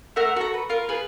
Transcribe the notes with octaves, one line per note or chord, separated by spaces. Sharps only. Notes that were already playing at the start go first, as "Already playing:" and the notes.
A3 A#4 E5 F#5
F#4 A4 A#5
B4
F4 A#4
G#4 B4